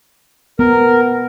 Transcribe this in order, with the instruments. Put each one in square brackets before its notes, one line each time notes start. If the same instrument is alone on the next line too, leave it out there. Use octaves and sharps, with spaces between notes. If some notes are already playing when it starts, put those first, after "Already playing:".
[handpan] B3 [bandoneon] A#4